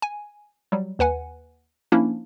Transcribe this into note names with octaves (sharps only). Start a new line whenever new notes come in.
G#5
F#3 G3
D#2 B4 F#5 G#5
F3 A#3 C#4 D4 E4